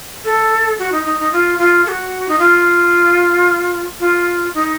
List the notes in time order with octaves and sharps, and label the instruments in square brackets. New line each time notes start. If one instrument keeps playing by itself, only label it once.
[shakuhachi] A4
F#4
D#4
D#4
D#4
F4
F4
A4
F#4
D#4
F4
F4
D#4